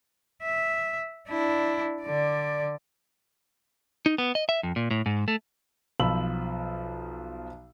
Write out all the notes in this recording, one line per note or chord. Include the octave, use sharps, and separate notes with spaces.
E5
D4 E4
D3 D5
D#4
B3
D#5
E5
F2
A#2
A2
G#2
A3
B1 F3 F4 B5 E6 F#7